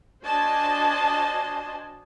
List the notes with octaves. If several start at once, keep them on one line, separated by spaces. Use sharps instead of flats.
D4 F#4 C5 D#5 G#5 A5